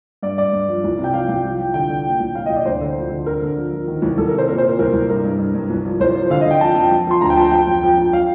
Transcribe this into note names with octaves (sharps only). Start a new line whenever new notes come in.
G2 D5
G2 D5
G2
F3
C2
C3
G5
F3 F5
C2 G5
F3
F3
D3 G5
D3
A#2
C2
A#2 F5
D#5
C2
D5
D2 C5
D3
F3
D3
D3 A#4
D3
F3
F3
D#3
C2
C2 A4
A#4
C3 C5
A#2 A#4
C5
A#2
A#4
C2 A#4
C2
G2 A#4
G2
G2
G2
C2
F3
C2 C5
F3
D3 F5
D#5
D3 G5
F3 A5
F2
F3
F3 C6
D2 A#5
G5
F3 A5
F3 G5
F2
F3
F2
F3 F5